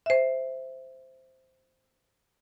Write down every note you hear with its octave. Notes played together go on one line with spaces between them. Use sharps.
C5 E5